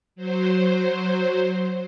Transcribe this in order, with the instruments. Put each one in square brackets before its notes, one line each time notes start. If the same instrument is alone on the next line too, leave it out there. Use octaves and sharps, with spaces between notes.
[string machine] F#3 C5